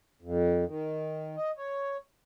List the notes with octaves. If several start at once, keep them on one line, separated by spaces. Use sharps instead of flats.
F2
D#3
D#5
C#5